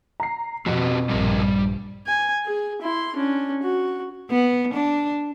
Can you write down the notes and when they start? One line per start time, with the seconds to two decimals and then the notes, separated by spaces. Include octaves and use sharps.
0.20 A#5 C7
0.66 F2 B2 C4 F#4 G4
1.09 A#1 G2 G3 G4 A#4
1.41 G3
2.07 G#5
2.46 G#4
2.81 E4 C6
3.15 C#4 D4
3.63 F#4
4.31 B3
4.74 D4